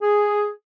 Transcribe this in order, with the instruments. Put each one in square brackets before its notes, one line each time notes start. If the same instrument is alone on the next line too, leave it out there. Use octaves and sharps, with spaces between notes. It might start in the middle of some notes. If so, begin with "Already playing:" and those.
[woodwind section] G#4